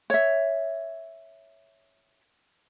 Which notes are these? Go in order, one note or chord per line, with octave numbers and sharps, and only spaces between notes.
C#5 E5